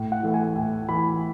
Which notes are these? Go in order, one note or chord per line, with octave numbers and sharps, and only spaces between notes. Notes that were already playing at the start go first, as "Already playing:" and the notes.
Already playing: A2
F#5
E3 A3
G#5
A2
E3 A3 B5